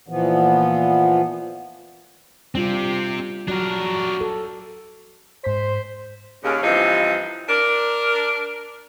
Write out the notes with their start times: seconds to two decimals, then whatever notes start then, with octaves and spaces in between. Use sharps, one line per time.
0.08 A#2 E3 F3 B3
2.55 G3 C4 D4 F4 G4
3.48 F#3 D4 F#4 A#4
4.21 A4
5.44 G#2 C5 C6 B6
6.43 D#2 C#3
6.62 G2 C3 E3 F3 D#4
7.49 D4 A#4